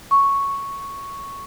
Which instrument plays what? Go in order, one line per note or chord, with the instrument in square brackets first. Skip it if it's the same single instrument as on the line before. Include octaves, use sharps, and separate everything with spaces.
[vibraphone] C#6